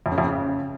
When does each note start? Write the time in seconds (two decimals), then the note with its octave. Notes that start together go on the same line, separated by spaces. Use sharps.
0.06 F2
0.12 C#3
0.18 F2
0.24 C#3